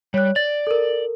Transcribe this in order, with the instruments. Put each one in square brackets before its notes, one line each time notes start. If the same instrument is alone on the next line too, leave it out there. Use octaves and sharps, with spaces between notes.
[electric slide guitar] G3 [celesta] C#5 F#6
[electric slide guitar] D5 [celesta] A6
[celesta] A4 A#4